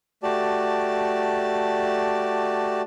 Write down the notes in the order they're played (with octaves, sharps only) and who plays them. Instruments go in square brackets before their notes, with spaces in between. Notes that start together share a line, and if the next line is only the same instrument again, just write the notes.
[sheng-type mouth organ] A3 F#4 G4 D5 A5